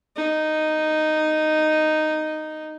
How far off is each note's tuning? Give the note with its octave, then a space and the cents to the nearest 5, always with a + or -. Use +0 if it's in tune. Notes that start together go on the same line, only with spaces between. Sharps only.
D#4 -5